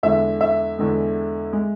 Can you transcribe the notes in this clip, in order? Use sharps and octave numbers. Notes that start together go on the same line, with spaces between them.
E2 D3 G#3 E5
E5
E2 D3 G#3
G#3